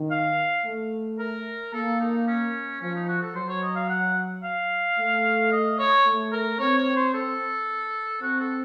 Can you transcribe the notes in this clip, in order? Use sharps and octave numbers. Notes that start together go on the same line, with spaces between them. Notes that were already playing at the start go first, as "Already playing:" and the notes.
Already playing: D#3
F5
A3
A#4
A#3 A4
D#4
C#4
F3 C#4
D#4
F#4
A4
F#3 C5
C#5
D#5
F5
F#5
F5
A3
D#5
C#5
A3
A#4
C4 C#5
C#5
C5
A4
C4 F#4
A4